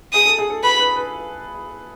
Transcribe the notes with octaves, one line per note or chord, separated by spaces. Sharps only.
G#4 D#6
A4
G#4
A4
B4 B5
B4
B4